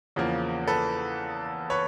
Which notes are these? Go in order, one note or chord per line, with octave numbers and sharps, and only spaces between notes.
E2 C#3 F3 A#3
A4 B4
B4 C#5